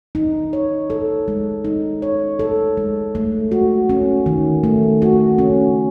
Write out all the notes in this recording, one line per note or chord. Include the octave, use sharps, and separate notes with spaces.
D#4
C#5
A4
G#3
D#4
C#5
A4
G#3
A3
F#4
C#4
D#3
A3
F#4
C#4